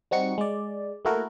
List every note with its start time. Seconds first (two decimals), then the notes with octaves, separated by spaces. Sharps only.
0.11 G3 C4 D#4 F#4 C#6 C#7
0.38 G#3 D5
1.05 A3 A#3 E4 F#4 A4 A#4